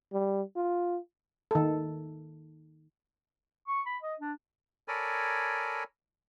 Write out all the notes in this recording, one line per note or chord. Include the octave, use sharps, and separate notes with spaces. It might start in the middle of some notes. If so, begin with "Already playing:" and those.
G3
F4
D#3 A4
C#6
B5
D#5
D4
A4 A#4 C#5 D5 G#5 B5